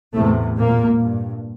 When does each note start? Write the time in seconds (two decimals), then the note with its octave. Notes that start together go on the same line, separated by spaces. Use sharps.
0.14 E2 A2 C3 A3
0.57 A#2 A#3
1.00 G2